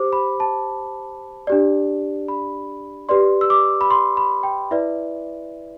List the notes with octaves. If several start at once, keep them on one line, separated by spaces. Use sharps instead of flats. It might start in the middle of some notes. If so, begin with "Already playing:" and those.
Already playing: G4 C5 D6
B5
A5
D4 G4 D5
B5
G4 B4 D5 C6
E6
D6
B5
C6
B5
G5
E4 B4 D5 E5